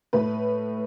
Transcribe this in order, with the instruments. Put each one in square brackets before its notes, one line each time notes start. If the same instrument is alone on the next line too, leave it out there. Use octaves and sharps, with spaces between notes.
[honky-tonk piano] A2 B4